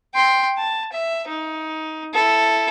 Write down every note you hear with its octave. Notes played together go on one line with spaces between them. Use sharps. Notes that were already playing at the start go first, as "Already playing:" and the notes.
G5 C6
A5
E5
D#4
E4 A4